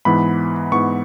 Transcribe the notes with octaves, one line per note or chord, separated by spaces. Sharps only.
G#2 E3 B3 B5
G#2 E3 B3 C#6